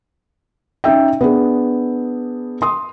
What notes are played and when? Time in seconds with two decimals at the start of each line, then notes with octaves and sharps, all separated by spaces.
0.84 C#4 D#4 E5 G5
1.21 B3 D4 G#4
2.62 C6 D#6